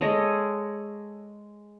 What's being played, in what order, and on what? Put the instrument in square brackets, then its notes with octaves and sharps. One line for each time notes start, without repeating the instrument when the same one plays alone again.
[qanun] G#3 A4 C#5 D#5